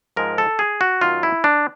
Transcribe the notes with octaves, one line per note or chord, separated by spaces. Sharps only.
G#2 F3 G#3 A#4
A4
G#4
F#4
F#2 D#3 F#3 F4
E4
D4